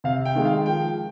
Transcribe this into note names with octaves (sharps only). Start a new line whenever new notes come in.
C3 F5
G5
D#3 G#3
F5
F3 G5